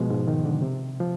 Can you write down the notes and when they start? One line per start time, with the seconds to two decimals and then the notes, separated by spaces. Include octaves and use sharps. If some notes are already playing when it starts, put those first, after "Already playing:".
Already playing: B2 F3 G#3
0.10 G#2
0.27 D#3
0.45 D3
0.62 C3
1.00 F3